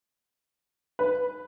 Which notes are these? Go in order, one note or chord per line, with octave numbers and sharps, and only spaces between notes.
B4